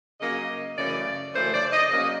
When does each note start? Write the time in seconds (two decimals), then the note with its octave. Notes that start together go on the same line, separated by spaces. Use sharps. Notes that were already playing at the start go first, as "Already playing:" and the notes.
0.20 C#3 F#3 A#3 C#4 D#5
0.77 F#2 C#3 E3 A3 C#4 D5
1.33 F#2 C#3 E3 A3 C#4 C5
1.53 D5
1.72 D#5
1.90 C#3 F#3 A#3 C#4 D#5